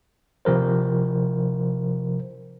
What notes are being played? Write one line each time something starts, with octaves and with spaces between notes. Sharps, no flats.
C3 F3 A#4 C5